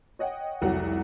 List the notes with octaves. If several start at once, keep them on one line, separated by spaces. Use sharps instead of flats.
C#5 D#5 F#5 G5
F1 C2 F#3 F#5